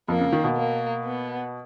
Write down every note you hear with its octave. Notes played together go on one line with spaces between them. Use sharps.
F2 A#3
C#3
D#3
B2
A#3
B3